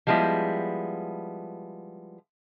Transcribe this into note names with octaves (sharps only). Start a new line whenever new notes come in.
F3 G3 G#3 B3 E4